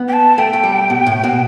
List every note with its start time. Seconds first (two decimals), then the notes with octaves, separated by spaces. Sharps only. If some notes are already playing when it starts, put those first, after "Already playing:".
Already playing: B3
0.08 G5
0.13 A5
0.38 A3 G5
0.53 A3
0.64 G3
0.90 B2
1.06 A2
1.24 B2